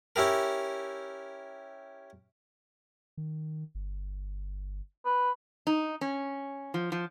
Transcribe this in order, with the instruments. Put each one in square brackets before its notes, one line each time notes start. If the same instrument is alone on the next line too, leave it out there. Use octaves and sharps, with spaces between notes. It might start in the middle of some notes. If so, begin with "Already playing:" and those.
[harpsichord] C#4 E4 G4 A#4
[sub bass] D#3
G1
[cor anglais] B4
[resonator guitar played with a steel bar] D#4
C#4
F3
F3